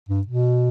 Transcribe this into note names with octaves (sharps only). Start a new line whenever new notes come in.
G2
B2